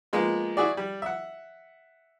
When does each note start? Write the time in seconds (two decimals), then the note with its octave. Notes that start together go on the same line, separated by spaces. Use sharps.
0.13 F3 G#3 A#3 B3
0.57 E4 F#4 G#4 D5
0.77 G3
1.02 E5 F#5